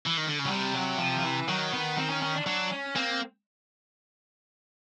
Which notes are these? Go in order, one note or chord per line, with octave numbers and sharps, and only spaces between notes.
E3
D#3
D3
C#3
F#3
C3 G3
F#3
F3
F3
E3
D#3 F#3
B3
C4
C#4
C#4
D4
F#3 D4
C#4
A#3 C4